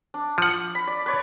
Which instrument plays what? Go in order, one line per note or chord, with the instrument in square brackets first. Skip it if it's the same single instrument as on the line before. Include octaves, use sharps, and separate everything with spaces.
[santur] D4
[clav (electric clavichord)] F3 F#5
[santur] B5
D5
B4 C#5 D5